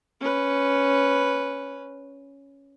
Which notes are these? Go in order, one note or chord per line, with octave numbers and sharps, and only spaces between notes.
C#4 B4